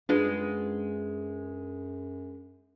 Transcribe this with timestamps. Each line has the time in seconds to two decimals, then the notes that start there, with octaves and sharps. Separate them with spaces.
0.09 F#2 G#3 B3 D4 F4